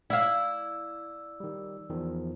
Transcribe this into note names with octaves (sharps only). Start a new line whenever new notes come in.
E4 D5 F5 E6
D#3 G3
E2 D#3 F3